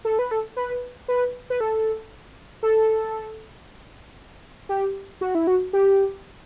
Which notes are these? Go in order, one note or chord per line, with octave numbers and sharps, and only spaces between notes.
A4
B4
A4
B4
B4
B4
A4
A4
G4
F#4
E4
F#4
G4